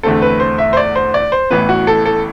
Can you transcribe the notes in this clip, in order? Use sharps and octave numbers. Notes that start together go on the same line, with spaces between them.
E2 D3 A3 C4 A4
B4
C5
E5
C5
D5
C5
D5
C5
A1 A2 E3 B3 B4
F#4
A4
A4